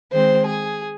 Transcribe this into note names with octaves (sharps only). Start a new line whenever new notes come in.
D#3 G#3 C4 C5
G#4